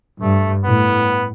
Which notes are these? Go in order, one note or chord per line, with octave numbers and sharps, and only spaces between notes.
G2 A3
A2 B3